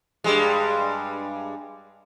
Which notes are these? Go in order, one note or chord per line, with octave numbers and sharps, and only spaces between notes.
G2 G3 G#3